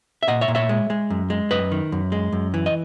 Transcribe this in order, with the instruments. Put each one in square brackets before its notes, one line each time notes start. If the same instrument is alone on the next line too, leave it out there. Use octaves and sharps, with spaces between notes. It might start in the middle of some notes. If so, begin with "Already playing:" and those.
[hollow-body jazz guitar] E5
A#2 D#5 F#5
C#5 E5
A#2
C#5 E5
G#3
G#3
F#2
G#3
F#2 B4 D#5
D#3
F#2
G#3
F#2
E3
D#5